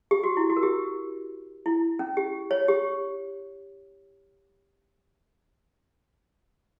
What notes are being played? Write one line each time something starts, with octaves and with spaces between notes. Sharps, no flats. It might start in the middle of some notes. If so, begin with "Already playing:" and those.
G4
F#4
E4
F#4
A#4
G4
E4
C#4
G4
C#5
G4